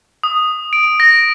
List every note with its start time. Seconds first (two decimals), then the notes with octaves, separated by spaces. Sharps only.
0.23 D#6
0.73 D7
1.00 A#6